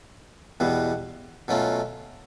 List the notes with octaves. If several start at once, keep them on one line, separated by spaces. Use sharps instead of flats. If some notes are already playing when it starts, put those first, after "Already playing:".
E2 B2 G3 B3
B2 F#3 A3 C#4 F4